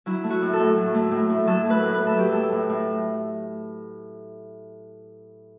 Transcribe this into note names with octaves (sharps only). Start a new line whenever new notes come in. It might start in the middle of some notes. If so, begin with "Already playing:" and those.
F#3 E4
A3
F#4
A2
A4
A2
F#3
A3
A2
A2
F#3 A4
A3 B4
A2
B4
A2
A4
F#3 G4
A3 A4
A2
A2